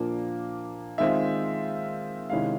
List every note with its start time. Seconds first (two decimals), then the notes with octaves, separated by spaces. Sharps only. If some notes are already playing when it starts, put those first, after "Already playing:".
Already playing: A#2 F3 A#3 D4
0.98 D#3 G#3 C4 F4 E5
2.30 C3 D#3 G#3 C#4 E4 F5